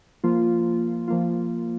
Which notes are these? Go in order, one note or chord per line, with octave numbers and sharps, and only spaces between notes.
F3 A#3 F4
F3 A#3 F4